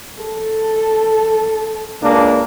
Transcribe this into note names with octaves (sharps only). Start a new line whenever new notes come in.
A4
C#2 A#3 D4